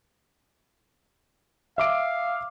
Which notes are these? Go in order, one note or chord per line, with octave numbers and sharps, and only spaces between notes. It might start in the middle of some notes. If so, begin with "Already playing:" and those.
E5 F5 D6 D7